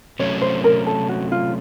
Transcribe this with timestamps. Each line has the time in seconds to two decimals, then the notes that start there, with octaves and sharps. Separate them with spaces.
0.19 C3 F#3 A3 C#4 C#5
0.42 C5
0.64 A#4
0.86 A4
1.09 F#4
1.32 F4